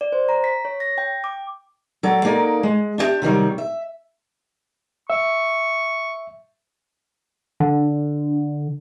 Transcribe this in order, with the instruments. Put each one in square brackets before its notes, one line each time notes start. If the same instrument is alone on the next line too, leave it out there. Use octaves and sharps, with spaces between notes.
[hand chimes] D5
C5
A#5
B6
C#5
A#6
G5
D6
[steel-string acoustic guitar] F#3 A4 D5
A#3 D#4 A4 A#4 D5
G#3
D4 E4 G4 E5
C3 D#3 F#3 G3
E5
[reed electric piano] E5 [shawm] C#6
[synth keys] D3